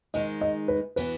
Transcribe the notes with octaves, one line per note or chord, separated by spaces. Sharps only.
G#2 D#3 G#3 D#4 G#4 D#5
D#5
B4
E3 B3 F#4 B4